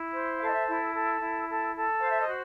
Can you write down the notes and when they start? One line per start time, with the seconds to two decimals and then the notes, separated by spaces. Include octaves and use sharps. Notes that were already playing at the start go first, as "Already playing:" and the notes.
Already playing: E4
0.12 C5
0.39 A4 F5
0.47 D#5
0.53 E5
0.67 E4
0.93 A4
1.19 E4
1.47 A4
1.74 A4
2.00 C5 F5
2.10 E5
2.20 D#5
2.26 F#4